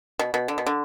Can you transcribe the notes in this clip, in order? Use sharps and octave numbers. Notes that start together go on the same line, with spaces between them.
B2
B2
D3
B2
D3